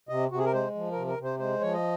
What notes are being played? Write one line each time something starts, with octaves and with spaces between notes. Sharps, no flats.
C3 D#5
C3 F#4
G#4
A#4
G#3 C5
F3
C3 A#4
A#4
C3
C5
G#3 C5
F3 C#5
D#5